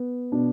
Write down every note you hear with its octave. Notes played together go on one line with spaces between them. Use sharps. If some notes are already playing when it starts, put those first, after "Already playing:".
Already playing: B3
B2 D4